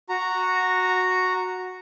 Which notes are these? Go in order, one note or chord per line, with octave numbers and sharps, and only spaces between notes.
F#4 A#5